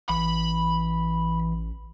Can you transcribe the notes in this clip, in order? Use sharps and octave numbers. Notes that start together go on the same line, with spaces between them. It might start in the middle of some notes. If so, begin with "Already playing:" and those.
A1 E3 B5